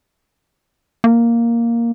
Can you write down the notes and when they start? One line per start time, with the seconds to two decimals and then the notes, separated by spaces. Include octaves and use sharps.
1.04 A#3